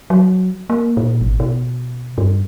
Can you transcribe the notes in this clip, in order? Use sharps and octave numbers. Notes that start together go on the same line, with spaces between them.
F#3
A#3
A#2
G#1
B2
G2